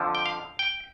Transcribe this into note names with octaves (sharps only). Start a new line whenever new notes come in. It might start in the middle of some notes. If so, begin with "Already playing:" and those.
Already playing: F2 D3 F3
G5
F5
G5